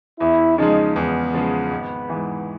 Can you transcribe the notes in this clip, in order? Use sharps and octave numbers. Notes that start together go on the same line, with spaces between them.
E2 E4
C#3 F3 G#3 D#4
E2 B3
C#3 F3 G#3
G#1
G#2 E3